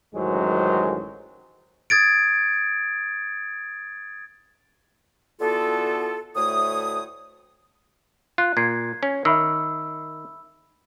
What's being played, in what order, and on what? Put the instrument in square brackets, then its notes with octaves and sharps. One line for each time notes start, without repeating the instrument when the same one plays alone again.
[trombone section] A1 F#2 D#3 F#3 G#3 C5
[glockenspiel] D#6 G#6 A6 D7
[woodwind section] D3 E3 B3 F4 F#4 A4
D2 A2 A3 C#5 D#6
[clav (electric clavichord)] F4 [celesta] F#6
[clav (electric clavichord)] A#2 [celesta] G#6 C7
[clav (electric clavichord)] C#4
[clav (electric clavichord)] D#3 [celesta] E5 B5 E6